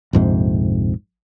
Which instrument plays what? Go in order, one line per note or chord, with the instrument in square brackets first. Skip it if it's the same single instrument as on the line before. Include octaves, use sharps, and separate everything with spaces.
[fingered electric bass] A#1 F2 G#2 C3